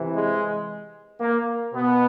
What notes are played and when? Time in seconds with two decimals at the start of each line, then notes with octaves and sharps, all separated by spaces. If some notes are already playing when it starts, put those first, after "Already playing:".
Already playing: C3 E3
0.13 G#3
1.20 A#3
1.74 B2 B3